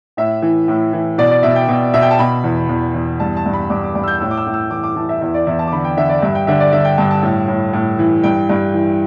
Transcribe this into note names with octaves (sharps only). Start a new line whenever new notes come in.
A2 E5
E3
A2
E3
B2 D5
D5
B2 E5
G5
B2
B2 E5
G5
A5
B2 B5
E2
E2
E2
G2 A5
A5
G2
B5
G2 D6
D6
G2 D6
E6
G6
A2 E6
D6
E6
A2
E6
E3 D6
D6
E3 A5
E5
E2 E5
D5
E2 E5
A5
D6
D3 B5
G5
D3 E5
D5
G2 E5
G5
D3 E5
D5
D3 E5
G5
G2 A5
A5
A2
A2
A2
E3
G2 G5
G2
E3